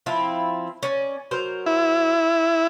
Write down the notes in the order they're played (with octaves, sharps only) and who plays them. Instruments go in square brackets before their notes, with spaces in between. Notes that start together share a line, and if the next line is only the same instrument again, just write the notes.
[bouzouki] F3 C4 E4
C#4 D5
F#3 A#4 C5
[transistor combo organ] E4